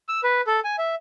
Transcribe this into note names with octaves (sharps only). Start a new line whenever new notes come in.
E6
B4
A4
G#5
E5